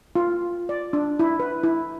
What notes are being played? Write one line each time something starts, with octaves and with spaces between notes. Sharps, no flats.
F4
D5
D4
E4
B4
E4